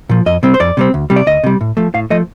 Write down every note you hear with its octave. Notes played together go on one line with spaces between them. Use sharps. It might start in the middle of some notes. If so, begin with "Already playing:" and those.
A#2 F3
F2 D#5
C3 G3 C4
C5
F2 D5
C3 G3 C4
D2
C3 G3
D5
D2 D#5
C3 G3
A2
F3 A3
A2 F5
F3 A3 D#5